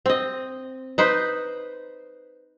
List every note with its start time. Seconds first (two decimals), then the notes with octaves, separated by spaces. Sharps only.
0.06 C4 D#5
0.98 D#4 B4 C5